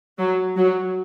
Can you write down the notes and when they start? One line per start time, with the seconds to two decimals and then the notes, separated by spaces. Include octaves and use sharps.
0.18 F#3
0.56 F#3